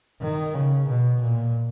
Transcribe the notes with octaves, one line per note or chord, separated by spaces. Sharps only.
D#3
C#3
B2
A#2